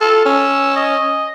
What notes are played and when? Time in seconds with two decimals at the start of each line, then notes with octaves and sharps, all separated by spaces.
0.01 F4 A4
0.25 C#4 E6
0.76 D#5